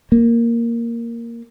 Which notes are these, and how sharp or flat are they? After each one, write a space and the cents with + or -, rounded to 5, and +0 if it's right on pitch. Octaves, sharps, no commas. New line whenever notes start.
A#3 +0